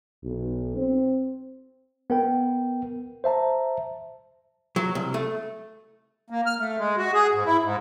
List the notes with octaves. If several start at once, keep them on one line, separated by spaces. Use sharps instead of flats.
B1
C4
B3 A#4 G5
C5 E5 A5 A#5
F#3
C2
A3
A#3
F6
A3
G#3
F#4
G#4
G#2
E4
G#2